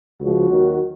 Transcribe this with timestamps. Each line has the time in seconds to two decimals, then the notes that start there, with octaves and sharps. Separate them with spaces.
0.21 C#2 C#3 F3 F#4
0.49 D#2 D#3 F#3